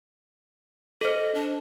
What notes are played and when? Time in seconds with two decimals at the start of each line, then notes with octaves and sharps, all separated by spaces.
1.01 A4 C5 D#5
1.34 D4